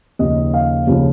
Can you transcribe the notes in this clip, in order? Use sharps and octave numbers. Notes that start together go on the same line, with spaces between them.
D#2 C#3 F3 D#5
F5
D#2 C#3 F3